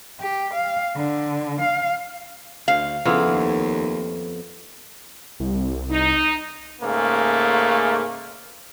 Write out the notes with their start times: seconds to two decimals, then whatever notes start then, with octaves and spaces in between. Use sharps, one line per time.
0.20 G4
0.54 F5
0.97 D3
1.61 F5
2.68 D2 F5
3.05 F2 C#3 B3 E4 F4
3.26 D#2
5.40 C2
5.90 D#4
6.81 G#2 C#3 A3 A#3